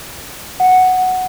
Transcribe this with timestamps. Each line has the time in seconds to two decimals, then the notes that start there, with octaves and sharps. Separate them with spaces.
0.60 F#5